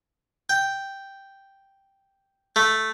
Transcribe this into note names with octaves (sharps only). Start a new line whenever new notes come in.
G5
A3